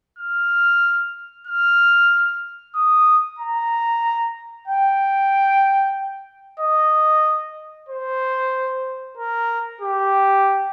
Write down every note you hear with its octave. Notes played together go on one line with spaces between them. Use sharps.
F6
F6
D#6
A#5
G5
D#5
C5
A#4
G4